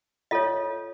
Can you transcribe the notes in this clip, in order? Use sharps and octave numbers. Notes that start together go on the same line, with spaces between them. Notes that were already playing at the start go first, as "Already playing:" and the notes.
F4 A4 C#5 D#5